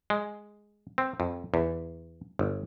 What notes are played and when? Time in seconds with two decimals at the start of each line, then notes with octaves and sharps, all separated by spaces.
0.10 G#3
0.98 C4
1.20 F2
1.54 E2
2.39 G1